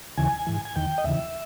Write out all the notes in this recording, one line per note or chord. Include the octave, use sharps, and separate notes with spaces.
D#2 C#3 E3 G#5
G#2 E3
G#5
E2 D#3 G5
D#5
D#2 C#3 E3 E5